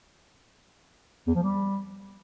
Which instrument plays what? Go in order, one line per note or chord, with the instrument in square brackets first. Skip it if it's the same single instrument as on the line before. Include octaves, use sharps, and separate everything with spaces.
[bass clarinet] E2
F3
G3